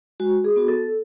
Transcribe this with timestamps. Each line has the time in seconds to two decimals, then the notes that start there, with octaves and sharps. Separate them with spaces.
0.20 G#3 F#4
0.44 G#4
0.56 B3 F#4
0.68 A4